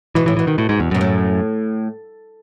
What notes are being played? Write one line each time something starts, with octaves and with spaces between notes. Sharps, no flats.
B2 E3
A2 E3
B2 E3
D#3
A2
G#2
E2
F#2 B2
A2